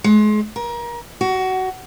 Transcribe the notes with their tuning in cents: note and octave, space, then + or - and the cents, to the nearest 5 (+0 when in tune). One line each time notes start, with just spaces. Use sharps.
G#3 +35
A#4 +30
F#4 +20